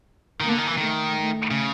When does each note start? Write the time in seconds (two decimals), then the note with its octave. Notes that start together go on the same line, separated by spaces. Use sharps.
0.40 D#3 A#3
0.49 D3
0.58 D#3
0.67 E3
0.77 D#3 A3
1.14 A3
1.51 C#3